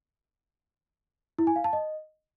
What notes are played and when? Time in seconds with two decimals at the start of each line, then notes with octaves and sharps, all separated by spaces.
1.39 E4
1.47 G#5
1.56 F5
1.64 A5
1.73 D#5